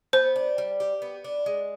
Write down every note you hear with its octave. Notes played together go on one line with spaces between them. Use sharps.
B3 C5
D4
G3
G4
B3
D4
G#3